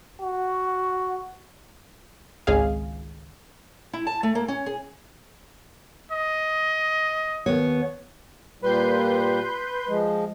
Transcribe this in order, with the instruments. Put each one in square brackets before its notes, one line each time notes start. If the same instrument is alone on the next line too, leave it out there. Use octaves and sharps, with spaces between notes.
[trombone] F#4
[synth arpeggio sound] G#1 C#2 G#4 F5
[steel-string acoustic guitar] E4
A5
A3
A#3
C#4
G#4
[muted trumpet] D#5
[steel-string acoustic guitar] D#2 B3 C#5
[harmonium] A#2 G3 [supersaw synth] B4 C6 G6
[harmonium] F3 G#3